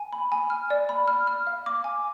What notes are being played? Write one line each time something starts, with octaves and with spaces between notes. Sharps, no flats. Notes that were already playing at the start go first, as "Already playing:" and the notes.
Already playing: G#5
B5
G#5
F6
D5
B5
F6
F6
F5
D6
G#5